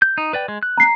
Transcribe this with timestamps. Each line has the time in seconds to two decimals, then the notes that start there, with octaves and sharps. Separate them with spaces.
0.02 G6
0.18 D#4
0.33 B4 D5 G5
0.48 G#3
0.63 F#6
0.78 A#5 C7